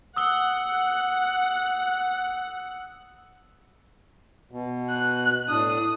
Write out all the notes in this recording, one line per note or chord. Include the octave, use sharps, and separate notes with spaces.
F#5 D#6 E6 G7
B2
F#6
A2 D4 D#6